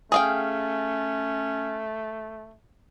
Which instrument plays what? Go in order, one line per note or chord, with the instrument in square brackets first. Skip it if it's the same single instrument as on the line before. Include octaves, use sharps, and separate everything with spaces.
[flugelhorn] A3 [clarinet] C#4 [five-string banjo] G#4 F5 G5